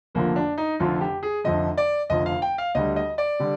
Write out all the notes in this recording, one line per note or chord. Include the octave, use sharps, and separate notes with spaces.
F1 F2 D3 F3 A#3
D4
D#4
F1 F2 D3 F3 F4
G4
G#4
F1 F2 D3 F3 D#5
D5
F1 F2 D3 F3 D#5
F5
G5
F5
D2 D3 G3 D#5
D#5
D5
D3 G3